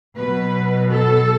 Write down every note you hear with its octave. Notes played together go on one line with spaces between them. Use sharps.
B2 F#3 B4
A4